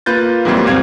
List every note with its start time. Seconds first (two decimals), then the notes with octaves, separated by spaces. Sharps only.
0.06 A#3 F4 B4 G6 A6
0.45 G#2 C3 E3 F#3 G3 A#3
0.66 E2 A#2 G3 C4 F5 G#6